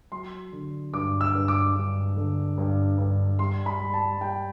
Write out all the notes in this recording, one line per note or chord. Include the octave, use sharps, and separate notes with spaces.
F#3 C6
D3
G2 D6
E6
G2
D6
G2
D3
G2
G2
G3 C6
B5
G3
A5
G3 G5